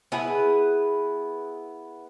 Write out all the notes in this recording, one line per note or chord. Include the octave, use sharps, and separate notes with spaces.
B3 E4 G#4 B4